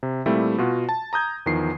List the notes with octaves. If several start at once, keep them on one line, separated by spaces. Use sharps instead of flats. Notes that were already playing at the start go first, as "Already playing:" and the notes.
C3
A#2 G3 A3 C4 E4
B2 F4 F#4
A5
A#5 D#6 G6 G#6
E2 D#3 F3 C7